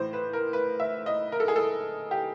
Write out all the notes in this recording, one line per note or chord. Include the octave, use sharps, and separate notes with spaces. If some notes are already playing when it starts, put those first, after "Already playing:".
Already playing: A2 E3 C5
B4
A#4
B4
E5
D#5
A#4
A4
G#4
A4
G4